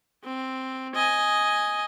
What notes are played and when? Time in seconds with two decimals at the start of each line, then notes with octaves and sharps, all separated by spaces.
0.24 C4
0.95 D#5 G#5